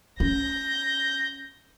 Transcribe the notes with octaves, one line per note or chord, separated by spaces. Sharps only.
C#4 G6 A#6